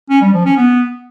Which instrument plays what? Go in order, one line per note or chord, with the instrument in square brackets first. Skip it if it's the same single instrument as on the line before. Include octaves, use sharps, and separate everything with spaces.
[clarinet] C#4
G3
F3
C#4
B3